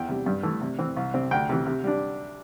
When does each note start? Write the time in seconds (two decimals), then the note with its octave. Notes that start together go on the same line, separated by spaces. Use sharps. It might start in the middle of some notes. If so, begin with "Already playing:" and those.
Already playing: E2 G5
0.08 C3 G3
0.26 G2
0.43 E3 A3
0.61 C3
0.79 E3 C4
0.96 C2
1.14 C3 G3 C4
1.31 D2 G5
1.49 C3 E3
1.66 C3
1.84 G3 D4